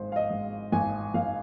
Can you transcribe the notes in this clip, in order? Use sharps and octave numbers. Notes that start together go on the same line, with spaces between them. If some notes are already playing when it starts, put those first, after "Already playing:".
Already playing: G#1 G#3 C5
F5
D#5
G#2
G#1 G#5
G#1 F5